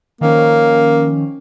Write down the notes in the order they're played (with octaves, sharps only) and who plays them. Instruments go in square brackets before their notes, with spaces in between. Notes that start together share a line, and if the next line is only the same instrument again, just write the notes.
[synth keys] D#3 F3 C#4 [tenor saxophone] A#3